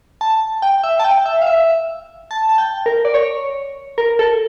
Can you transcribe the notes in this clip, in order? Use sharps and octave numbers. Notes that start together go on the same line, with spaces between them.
A5
G5
E5
A5
G5
E5
F5
E5
A5
A5
G5
A#4
D5
C#5
A#4
A4